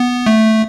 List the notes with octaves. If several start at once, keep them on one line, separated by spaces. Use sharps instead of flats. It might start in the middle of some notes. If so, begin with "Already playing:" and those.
Already playing: B3
A3